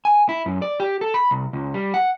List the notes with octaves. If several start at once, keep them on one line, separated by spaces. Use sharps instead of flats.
G#5
E4
F#2
D5
G4
A4
B5
C2
C#2
G3
F#5